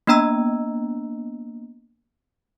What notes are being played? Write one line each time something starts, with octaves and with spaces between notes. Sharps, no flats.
A#3 B3 D4 D#5 A#5 E6